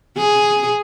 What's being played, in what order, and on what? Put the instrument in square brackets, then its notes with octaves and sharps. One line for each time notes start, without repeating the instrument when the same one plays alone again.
[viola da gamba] G#4